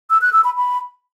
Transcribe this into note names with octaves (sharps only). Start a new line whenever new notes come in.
E6
F#6
E6
B5
B5